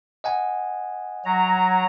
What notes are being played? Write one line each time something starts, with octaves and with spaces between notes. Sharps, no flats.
D#5 F#5 G#5
F#3 A#5